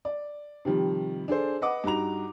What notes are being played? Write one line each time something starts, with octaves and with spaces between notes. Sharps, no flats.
D5
C3 D#3 F3 G3
D4 G#4 A4 C5
B4 D#5 F#5 D6
G2 D#4 F#4 A#5 F7